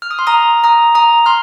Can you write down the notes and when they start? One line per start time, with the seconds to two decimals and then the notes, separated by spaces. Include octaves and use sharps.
0.02 F6
0.11 D#6
0.19 C6
0.27 A#5 D#6
0.64 A#5 D#6
0.95 A#5 D#6
1.26 C6 F6